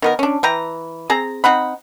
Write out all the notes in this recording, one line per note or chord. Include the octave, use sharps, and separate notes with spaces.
D#3 B3 A#4
C#4 D4
E3 G5 A#5
C4 G#4 A#5
C4 D#4 F#5 B5